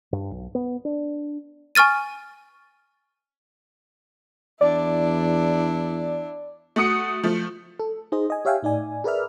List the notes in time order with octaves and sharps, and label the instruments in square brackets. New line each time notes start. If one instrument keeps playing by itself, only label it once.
[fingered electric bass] G2
B1
B3
D4
[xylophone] G#5 C#6 F6 A6 D#7
[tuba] E2 [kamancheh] D4 E4 [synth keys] D5
[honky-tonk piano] A3 F#4 D#6 C#7
F3 A3
[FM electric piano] A4
D#4 G#4 C5 D#5
D#5 G#5
G4 C#5 E5 F5 G5 G#5
A2 D#4 D5 G#5
G#4 A#4 B4 D5 E5 F6